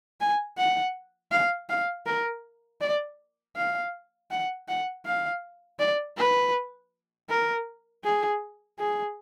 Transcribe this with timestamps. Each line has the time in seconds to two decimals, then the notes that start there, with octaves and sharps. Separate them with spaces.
0.21 G#5
0.58 F#5
1.32 F5
1.70 F5
2.06 A#4
2.81 D5
3.56 F5
4.31 F#5
4.68 F#5
5.06 F5
5.80 D5
6.18 B4
7.30 A#4
8.04 G#4
8.79 G#4